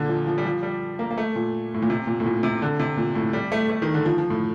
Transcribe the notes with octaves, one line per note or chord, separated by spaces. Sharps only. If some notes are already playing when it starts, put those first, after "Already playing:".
Already playing: A#2 D3
F3
F3
G3
F3
G3
A#3
A#3
A3
A#2
A2
A#2
C3
A#2
A2
A#2
C3
D3
C3
A#2
A2
G3
A3
A3
D#3
D3
F3
F3
A2